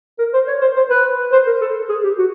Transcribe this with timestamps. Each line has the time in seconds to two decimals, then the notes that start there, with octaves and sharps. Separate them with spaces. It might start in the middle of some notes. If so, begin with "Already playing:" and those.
0.19 A#4
0.33 C5
0.47 C#5
0.61 C5
0.75 C5
0.90 B4
1.32 C5
1.47 A#4
1.61 A4
1.89 G#4
2.04 G4
2.18 F#4